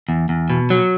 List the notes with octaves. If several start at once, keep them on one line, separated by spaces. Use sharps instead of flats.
E2
E2
B2
F#3